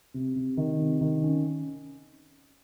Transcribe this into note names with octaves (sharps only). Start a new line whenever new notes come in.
C3
C3
D#3
C3
D#3
C#4